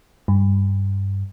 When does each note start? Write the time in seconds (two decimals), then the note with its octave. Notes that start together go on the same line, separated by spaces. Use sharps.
0.28 G2